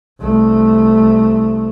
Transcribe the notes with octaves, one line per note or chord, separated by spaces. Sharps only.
C2 A3